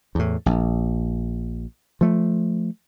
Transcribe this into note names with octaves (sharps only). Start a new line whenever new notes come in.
E2 A2
A#1
F3 A3